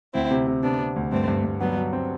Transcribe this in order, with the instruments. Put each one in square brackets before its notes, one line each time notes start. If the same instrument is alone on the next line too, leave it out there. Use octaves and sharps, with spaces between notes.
[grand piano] D2 [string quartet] C4 E4
[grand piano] C3
C3
[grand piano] C3 [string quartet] B3 D4
[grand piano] C3
D2
[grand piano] G2 [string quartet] A3 C4
[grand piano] G2
G2
[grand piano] F#3 [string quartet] G3 B3
[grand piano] F#3
C4